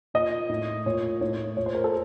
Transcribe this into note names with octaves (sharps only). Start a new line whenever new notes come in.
A#2 D#5
A2
A#2 C#5
A2 C#5
A#2 C#5
C5
A#4
A4